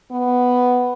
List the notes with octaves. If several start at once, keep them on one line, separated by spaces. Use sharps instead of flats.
B3